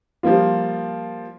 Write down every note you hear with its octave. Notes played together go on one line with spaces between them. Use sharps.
F3 G3 A#3 F4